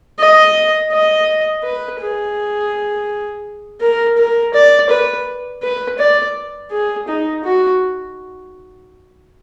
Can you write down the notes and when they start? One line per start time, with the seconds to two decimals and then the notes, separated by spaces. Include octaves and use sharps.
0.19 D#5
0.92 D#5
1.63 B4
2.00 G#4
3.82 A#4
4.17 A#4
4.54 D5
4.90 B4
5.63 B4
5.99 D5
6.71 G#4
7.08 D#4
7.44 F#4